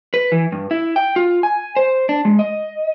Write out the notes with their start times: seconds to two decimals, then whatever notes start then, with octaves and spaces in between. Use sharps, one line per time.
0.14 B4
0.32 E3
0.52 G2
0.71 E4
0.96 G5
1.16 F4
1.43 G#5
1.76 C5
2.09 D4
2.25 G#3
2.39 D#5